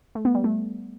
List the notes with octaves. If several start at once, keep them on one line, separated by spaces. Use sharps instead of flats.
A3
B3
G3
A3